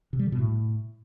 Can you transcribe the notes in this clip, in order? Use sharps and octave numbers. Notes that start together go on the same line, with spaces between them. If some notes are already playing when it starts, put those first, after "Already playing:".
C3
G3
D3
B2
A2